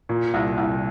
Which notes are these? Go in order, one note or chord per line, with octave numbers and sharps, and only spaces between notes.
A#2
C2
C2